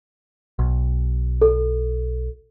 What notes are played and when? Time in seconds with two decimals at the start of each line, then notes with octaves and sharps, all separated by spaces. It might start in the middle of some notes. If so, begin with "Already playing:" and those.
0.59 B1
1.41 A4